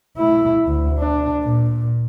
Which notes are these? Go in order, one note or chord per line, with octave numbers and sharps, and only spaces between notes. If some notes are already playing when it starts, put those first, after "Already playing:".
A3 E4
D2
D4
A#2